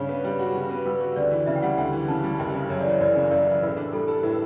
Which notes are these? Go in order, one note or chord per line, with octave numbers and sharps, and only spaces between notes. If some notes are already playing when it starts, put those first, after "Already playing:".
Already playing: G2 C#3 C#5
B3
G3
F#4
C#3
B3
G3 B4
F#4
D2 D5
E3
C#3 E5
G5
G3 F#5
D2 G5
E3
C#3 A5
G3
F#1 G5
C#3
F#2 C#5
D5
E3
C#5
F#1 D5
C#3
F#2 D5
E3
A2 B4
D4
G3 A4
A4
A2 B4